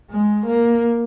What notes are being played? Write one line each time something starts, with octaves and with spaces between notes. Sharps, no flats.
G#3
A#3